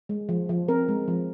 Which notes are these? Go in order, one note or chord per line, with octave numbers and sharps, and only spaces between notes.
G#3
F3
F3
C4 A#4
G#3
F3